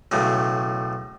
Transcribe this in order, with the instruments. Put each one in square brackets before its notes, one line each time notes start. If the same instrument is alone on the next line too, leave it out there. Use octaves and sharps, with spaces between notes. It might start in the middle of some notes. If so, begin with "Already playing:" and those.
[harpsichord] B1 A2 C#3